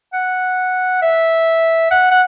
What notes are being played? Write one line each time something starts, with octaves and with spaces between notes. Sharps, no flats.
F#5
E5
F#5
F#5